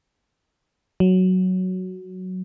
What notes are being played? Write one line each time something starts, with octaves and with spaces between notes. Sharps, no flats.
F#3